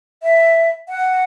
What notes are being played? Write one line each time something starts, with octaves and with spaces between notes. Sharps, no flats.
E5
F#5